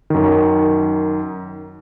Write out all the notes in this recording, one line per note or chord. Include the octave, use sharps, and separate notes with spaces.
F#2 D#3